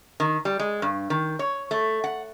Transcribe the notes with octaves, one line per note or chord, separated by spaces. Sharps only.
D#3
G3
G#3
G2
D#3
C#5
A3
F#5